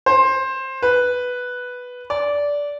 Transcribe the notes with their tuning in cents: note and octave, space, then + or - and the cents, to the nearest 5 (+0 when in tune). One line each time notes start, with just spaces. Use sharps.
C5 +15
B4 +0
D5 -15